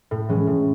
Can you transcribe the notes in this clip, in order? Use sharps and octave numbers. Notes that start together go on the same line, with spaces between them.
A2
E3 G#3 C#4
A2